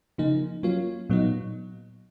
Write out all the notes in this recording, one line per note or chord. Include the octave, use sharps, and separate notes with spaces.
C#3 F3 A#3 D#4
F#3 A#3 C#4 F4
A#2 F#3 B3 D#4